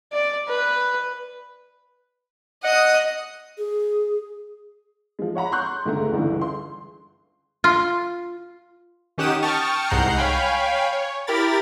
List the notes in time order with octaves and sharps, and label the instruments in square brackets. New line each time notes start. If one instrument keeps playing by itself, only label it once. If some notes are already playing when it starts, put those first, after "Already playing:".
[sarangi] D5
B4
[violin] D#5 D#6 [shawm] F#5
[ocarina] G#4
[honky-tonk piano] F3 G#3
C#5 F#5 A#5 B5
C6 C#6 F#6 G6
C#2 G#2 D3 A3 A#5
G1 C#2 D3 E3
C6
[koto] F4
[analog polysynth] D#3 C#4 G4 F#5 D#6 E7
G5 A5 C#6 D#6 F6 A6
C2 G#2 F#5 A#5 G6 C7
C#5 F5 G5 G#5 B5
C#5
E4 G4 A#4 B5 A6